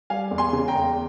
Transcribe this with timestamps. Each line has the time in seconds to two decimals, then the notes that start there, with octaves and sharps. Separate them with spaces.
0.10 G3 F5 G#5
0.31 E2
0.38 G#5 C6
0.53 C#3
0.68 G5 A#5
0.76 E2